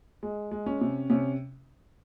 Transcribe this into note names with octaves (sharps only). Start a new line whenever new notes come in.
G#3
G#3
C#4
C3
C3 C#4